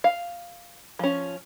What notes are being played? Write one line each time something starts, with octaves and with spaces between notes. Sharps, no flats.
F5
F3 C#4